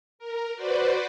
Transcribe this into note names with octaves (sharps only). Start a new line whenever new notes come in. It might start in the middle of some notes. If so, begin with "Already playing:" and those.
A#4
F#4 B4 C5 D5